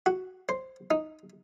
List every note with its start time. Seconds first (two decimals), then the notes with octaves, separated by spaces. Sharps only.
0.06 F#4
0.49 C5
0.91 D#4